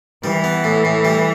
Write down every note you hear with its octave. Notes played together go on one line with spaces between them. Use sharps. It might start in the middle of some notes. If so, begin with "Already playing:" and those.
E3 G3
B3
A2
A2
G3